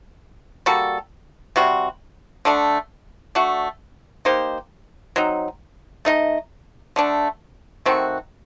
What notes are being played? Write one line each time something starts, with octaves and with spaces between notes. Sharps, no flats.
G3 A#3 F#4 A4
C3 G3 C4 F#4
D3 A3 D4
A3 D4 F#4
A#3 D#4 G4 C5
F#3 C4 D#4
A3 D#4 A4 D#5
D3 A3 D4
D#3 A3 C4 F#4